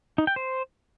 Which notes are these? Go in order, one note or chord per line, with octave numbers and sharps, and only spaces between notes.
D#4
G5
C5